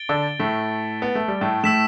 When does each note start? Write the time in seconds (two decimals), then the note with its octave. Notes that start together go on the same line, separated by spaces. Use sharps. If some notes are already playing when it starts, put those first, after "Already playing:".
Already playing: A6 D7 G7
0.09 D3 D4
0.39 A2 A3
1.02 B3
1.15 A3
1.28 G3
1.41 A2 A3
1.63 A2 A3 E6 B6 E7